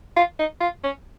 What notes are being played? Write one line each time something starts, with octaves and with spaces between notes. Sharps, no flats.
F4
D#4
F4
C#4